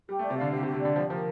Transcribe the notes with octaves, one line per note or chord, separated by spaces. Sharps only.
G3 G4
A3
D5
C3
D3 F5
C3 G4
C3
G4
C3
D3 D5
F3 G4
F3 A#4